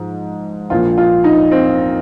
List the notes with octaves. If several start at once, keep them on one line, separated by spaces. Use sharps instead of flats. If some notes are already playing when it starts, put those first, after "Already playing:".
Already playing: G#2 F3
A#1 A#2 F3 F4
F4
D#4
C4